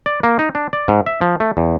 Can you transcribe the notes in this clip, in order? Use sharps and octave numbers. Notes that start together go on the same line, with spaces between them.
D5
A#3
D#4
D4
D5
G#2
E5
F3
A3
E2